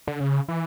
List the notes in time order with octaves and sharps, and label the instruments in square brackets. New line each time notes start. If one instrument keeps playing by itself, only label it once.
[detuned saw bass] D3
C#3
E3